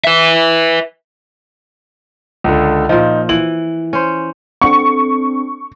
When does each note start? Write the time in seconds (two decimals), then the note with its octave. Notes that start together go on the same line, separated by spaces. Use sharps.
0.04 B4 E5
2.44 C#2 D3
2.89 A#2 F3 D#4
3.29 E3 F#7
3.93 C#4 C5
4.61 C4 D4 A4 C#6